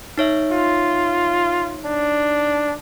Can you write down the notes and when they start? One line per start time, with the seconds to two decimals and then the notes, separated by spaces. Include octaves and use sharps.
0.18 D#4 C#5 E5
0.52 F4
1.86 D4